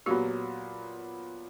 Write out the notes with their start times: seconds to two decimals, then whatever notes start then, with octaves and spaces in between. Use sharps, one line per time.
0.06 A#2 F#3 B3 F4 G4